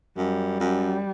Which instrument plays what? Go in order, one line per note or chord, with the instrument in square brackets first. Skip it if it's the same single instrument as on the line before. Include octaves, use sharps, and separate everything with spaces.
[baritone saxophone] F#2 [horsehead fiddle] G3
[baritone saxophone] F#2